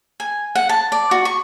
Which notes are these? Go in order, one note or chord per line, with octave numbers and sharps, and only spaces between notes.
G#5
F#5
A5
D5
F#4
C#6